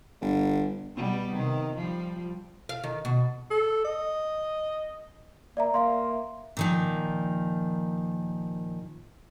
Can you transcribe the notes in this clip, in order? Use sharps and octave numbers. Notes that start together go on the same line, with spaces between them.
G1
B2 G3 B3
C3 D#3
F3 G3
F5
D#3
B2
A4
D#5
A#3 D5 E5 A#5
A#3 E5 F5 C6
A#2 D#3 F3